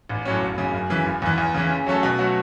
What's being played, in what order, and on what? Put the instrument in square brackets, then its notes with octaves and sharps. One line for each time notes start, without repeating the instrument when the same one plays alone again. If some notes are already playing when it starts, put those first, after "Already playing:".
[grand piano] A1
A2 F#3 C#4
F#1
F#2 C#3
F#2
C#3 E3
F#1
E2 E3
E2
C#3 E3
C#3
F#3 A3 C#4 A4
B2
F#3 A3 F#4